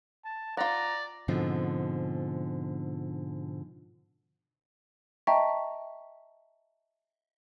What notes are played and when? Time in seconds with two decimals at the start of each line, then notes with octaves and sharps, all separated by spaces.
0.25 A5
0.57 F4 D5 F#5 A#5
1.28 G#2 B2 D3 F3 C4 D#4
5.27 D#5 E5 G5 A5 A#5 C#6